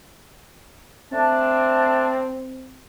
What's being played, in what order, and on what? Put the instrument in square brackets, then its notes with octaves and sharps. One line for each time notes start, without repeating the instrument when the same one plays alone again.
[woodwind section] A3 D4 A5 [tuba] C4